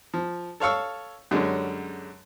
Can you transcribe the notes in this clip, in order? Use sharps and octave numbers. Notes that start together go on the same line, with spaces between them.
F3
A4 C#5 F5 C#6 E6
F#2 D3 G3 G#3 C#4